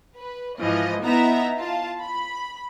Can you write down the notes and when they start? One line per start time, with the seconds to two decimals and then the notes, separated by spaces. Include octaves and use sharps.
0.16 B4
0.59 G#2 E3 F3 D#5
1.04 B3 D#4 E4 E5 A#5
1.58 F4 A5
2.01 B5